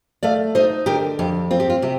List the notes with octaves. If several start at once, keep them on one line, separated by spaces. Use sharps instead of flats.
A3 D5 F5
D#4 C5 D#5
D3 G4 A#4
F2 G4
C4 F4
G4
F4
C3 G4